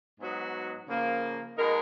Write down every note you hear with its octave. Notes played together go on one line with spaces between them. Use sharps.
G#2 F#3 B3 D#4 F#4
C#3 F3 A#3
B2 G#3 D#4 A#4